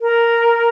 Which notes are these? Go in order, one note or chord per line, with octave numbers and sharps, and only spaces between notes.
A#4